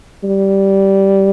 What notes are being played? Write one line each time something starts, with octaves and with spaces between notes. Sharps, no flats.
G3